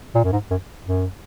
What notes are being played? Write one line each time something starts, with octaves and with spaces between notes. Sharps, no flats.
A#2
F#2
G#2
F#2
F#2